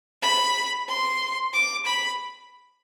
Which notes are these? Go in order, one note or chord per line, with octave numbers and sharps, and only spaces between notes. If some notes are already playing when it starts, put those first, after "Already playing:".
B5
C6
D6
B5